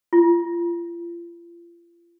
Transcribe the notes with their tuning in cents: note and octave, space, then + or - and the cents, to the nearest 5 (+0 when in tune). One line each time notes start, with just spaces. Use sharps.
F4 -35